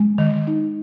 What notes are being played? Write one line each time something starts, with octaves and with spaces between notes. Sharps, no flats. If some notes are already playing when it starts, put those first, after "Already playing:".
Already playing: G#3
D#3
D#4